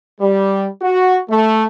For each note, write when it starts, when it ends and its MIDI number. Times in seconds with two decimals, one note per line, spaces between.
0.21 0.67 55
0.82 1.19 66
1.30 1.66 57